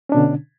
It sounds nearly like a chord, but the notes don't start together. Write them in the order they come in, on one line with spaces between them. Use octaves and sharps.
C#4 D4 B2 D3